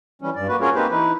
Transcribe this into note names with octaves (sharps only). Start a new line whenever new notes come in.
E3 G3 C#4
G2 D5
A#3 F#4 B4
C#4 F4 F#4 G#4 A#4 C#5
A#3 C4 D#4 G4 B4 C5
E3 D#4 E4 B4